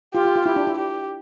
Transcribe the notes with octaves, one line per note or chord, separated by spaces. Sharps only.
F4 G4
F4
F4
E4 G4
D4
E4
G4